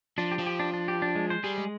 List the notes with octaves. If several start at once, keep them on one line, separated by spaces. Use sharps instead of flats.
F3 D4
G4
F3
G4
D4
D4
G4
D4
G#3
C5
G3 G#4
G#3